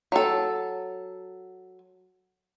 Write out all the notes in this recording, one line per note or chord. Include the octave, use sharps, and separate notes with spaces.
F#3 A4